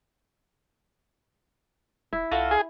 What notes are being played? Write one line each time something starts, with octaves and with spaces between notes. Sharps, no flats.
D#1 E4
C2 F4 F#4 A4
G#4